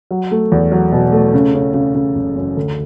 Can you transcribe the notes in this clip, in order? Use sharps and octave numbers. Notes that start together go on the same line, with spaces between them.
F#3
A3
E2
F#3
B2
A3
C#3
C#3
C#3
C#3
F#1
F#2
D2